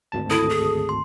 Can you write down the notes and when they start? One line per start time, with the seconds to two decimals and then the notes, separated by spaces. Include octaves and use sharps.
0.12 G#1 D2 A5
0.30 E4 A4 D#6
0.50 G#4
0.89 C6